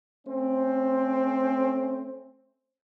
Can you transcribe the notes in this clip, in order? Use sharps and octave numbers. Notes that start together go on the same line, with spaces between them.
A3 C4 C#4 C5